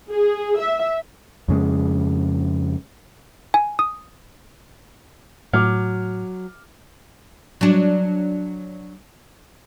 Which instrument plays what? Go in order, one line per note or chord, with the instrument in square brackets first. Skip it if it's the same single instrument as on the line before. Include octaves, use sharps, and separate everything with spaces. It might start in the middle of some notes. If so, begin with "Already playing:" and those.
[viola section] G#4
E5
[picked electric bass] F2 C#3 G#3
[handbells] G#5
D#6
[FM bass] A2 [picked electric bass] F#3 [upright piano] D6 F6
[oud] F#3 D4